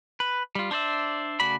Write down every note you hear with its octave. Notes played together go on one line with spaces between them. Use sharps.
B4
G3 F4
D4 C5 D5 E5
C#3 A3 F#4 D5 B5